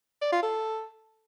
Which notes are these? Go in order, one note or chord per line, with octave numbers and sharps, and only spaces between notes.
D5
F4
A4